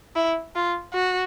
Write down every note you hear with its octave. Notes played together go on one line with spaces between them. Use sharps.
E4
F4
F#4